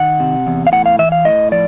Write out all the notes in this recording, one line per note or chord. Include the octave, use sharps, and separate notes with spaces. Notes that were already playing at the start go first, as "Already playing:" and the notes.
Already playing: D#3 F#5
C3
E2
F5
A2 F#5
F5
E3 E5
F5
A2 D#5
F3 D5